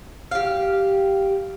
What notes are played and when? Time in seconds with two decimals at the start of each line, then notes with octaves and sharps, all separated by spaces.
0.31 G4 F5